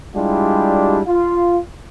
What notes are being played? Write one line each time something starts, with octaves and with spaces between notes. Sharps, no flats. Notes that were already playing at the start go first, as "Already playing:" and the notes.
G3 G#3 D4 E4 F4 G4
F4